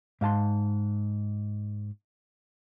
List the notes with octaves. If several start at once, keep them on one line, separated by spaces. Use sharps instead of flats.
G#2 F5 A5 C6